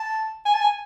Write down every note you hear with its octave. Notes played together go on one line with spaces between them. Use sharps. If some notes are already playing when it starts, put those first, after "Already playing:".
Already playing: A5
G#5
A5
G#5